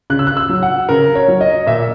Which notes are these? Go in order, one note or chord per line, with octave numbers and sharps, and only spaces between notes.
C#3 F#6
E6
F#6
E6
F#3
F#5
C#3 A#4
C#5
F#3
D#5
A#2 E5